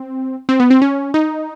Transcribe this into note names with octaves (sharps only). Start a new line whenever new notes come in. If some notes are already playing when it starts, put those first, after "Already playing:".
Already playing: C4
C4
B3
C4
C#4
D#4